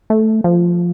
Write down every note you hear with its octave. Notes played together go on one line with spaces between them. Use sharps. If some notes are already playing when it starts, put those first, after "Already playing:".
A3
F3